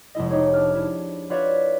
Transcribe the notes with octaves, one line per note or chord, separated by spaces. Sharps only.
F1 G#3 E4 D#5
D#4 G4 G#4 C#5
D4 F6
E4
F4 B4 C#5 D5 E5 F5